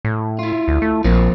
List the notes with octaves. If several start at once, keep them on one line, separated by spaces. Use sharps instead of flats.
A2
E4 F4
D2
A3
A#1 F3 A#3 C4